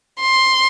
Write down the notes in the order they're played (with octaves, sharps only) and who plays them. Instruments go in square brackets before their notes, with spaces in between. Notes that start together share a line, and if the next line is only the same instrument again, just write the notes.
[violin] C6